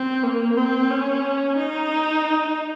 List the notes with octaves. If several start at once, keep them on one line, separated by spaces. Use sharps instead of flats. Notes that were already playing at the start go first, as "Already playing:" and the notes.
Already playing: C4
A#3
C4
C#4
D#4